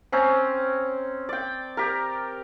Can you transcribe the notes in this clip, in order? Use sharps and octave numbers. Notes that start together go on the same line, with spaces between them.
C4 C#4 A#5
D5 G5
G4 A#4